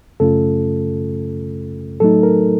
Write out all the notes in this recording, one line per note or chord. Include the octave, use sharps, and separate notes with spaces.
F#2 C#3 A3 C#4 F4 A4
A2 F#3 A3 D#4 A4
A#4